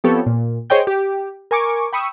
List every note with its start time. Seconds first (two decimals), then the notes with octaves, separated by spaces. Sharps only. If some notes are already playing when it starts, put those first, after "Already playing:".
0.04 F3 B3 C4 G4 A4 C#5
0.26 A#2
0.70 G#4 C5 C#5 D#5 G5 G6
0.87 G4
1.51 A#4 G#5 C#6 D6
1.93 G5 B5 C#6 D#6 E6